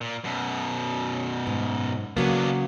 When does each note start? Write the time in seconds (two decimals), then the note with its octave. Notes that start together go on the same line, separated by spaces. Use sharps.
0.01 A#2
0.24 F#2 B2
1.47 G#2
2.17 C#3 F#3 A#3 B3 D4